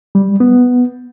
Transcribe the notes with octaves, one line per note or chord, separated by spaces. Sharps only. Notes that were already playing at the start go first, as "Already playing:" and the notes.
G3
B3